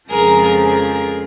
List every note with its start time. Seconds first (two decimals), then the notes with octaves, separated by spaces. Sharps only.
0.11 F2 C#3 F3 G#3 G#4 A#4
0.63 G#4 A#4